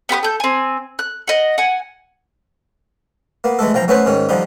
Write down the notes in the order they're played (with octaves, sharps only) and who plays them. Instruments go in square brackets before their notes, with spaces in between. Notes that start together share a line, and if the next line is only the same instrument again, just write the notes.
[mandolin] B3 G4 B5 D#6
A4 G6
C4 G#5
F#6
D#5 F#5
F#5 G#5
[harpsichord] A#3 B3
E3 G#3 A3 A4
B1 F3 G5 A#5
A3 B3 C#4 E4 B4 C5
G#2 D#3 C#4
D3 F3 G3 D#4